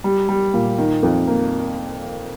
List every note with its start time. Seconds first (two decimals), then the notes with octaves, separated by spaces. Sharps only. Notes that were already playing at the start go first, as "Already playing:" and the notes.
0.04 G3
0.29 G3
0.54 A#2
0.78 D#3
1.03 F2
1.27 A#3